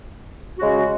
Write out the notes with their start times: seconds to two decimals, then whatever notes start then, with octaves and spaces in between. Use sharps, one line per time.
0.58 C#3 G#3 C#4 F#4